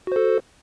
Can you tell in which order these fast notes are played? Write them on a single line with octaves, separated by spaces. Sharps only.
F#4 C5 A4